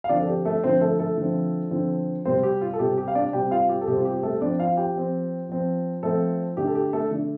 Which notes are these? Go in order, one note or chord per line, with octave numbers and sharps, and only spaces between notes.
F5
D3 F3 C4 D4 D5
A4
G4
A3 A4
D3 F3 C4 C5
A3 A4
A3 A4
D3 F3 C4
D3 F3 C4
C3 G3 C4 C5
G4
F4
A4
C3 G3 C4 G4
G4
F5
D4 D5
C3 G3 C4 G4 G5
F4 F5
G4
A4
C3 G3 C4 G4
F4
G4
G4
A3 A4
F3 C4 D4 D5
F4 F5
G4 G5
F3 C4
F3 C4
F3 A3 C4 A4
D3 A3 D4 G4
A4
G4
A3 A4
D3 A3 D4